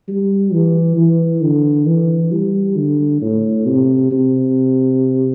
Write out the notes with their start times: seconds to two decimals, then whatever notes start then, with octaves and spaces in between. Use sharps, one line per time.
0.08 G3
0.52 E3
0.97 E3
1.42 D3
1.86 E3
2.32 G3
2.77 D3
3.21 A2
3.65 C3
4.11 C3